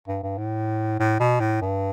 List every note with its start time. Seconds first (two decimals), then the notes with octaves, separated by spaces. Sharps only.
0.08 G2
0.24 G2
0.38 A2
1.00 A2
1.20 B2
1.40 A2
1.62 G2